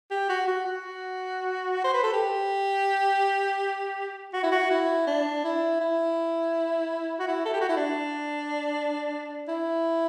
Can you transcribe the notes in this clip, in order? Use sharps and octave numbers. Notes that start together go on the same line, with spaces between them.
G4
F#4
F#4
F#4
C5
B4
A4
G4
F#4
E4
F#4
E4
D4
E4
E4
F#4
E4
A4
G4
F#4
E4
D4
E4